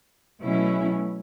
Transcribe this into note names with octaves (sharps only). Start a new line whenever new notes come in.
B2 F#3 A3 C#4 E4